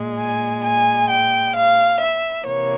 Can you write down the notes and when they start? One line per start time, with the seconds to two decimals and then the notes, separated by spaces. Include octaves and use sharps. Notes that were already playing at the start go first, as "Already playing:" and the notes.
Already playing: A#2 G#3
0.18 G#5
0.64 G#5
1.09 G5
1.55 F5
2.00 E5
2.45 C3 E3 A#3 C#5